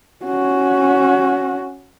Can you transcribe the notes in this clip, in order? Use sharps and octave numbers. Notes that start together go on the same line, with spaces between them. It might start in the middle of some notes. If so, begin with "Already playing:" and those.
C#4 F#4